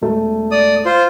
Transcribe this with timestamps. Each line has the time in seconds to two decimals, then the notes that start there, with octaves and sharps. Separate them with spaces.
0.01 E1 A3
0.51 D5 D#6
0.86 F4 C5